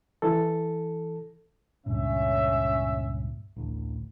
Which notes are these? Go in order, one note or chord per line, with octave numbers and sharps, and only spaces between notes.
E3 A4
C#2 G2 A#2 C#4 E5
A1 D2